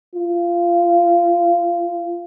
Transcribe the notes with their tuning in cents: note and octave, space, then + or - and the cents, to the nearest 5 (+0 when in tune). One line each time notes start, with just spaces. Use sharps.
F4 -20